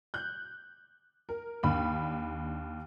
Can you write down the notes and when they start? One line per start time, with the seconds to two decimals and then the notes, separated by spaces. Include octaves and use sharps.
0.14 F#6 G6
1.29 A#4
1.63 D#2 D4 B5